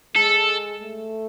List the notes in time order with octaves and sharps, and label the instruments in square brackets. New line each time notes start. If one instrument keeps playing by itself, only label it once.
[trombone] G#3 [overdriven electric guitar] A4
[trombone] A3